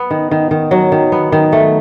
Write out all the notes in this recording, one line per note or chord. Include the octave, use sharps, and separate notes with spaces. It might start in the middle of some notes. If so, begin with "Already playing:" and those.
Already playing: B3
D#3
D#3
D#3
F#3
D#3
B3
D#3
A3